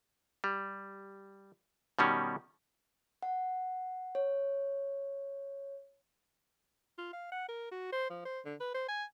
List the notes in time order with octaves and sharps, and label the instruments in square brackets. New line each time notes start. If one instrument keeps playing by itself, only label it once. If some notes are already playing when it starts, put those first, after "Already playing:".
[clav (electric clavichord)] G3
B2 D#3 G3 C#4
[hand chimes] F#5
C#5
[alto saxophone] F4
F5
F#5
A#4
F#4
C5
F3
C5
D3
B4
C5
G#5